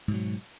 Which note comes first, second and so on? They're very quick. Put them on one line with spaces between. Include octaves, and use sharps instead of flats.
G#2 B2 F#3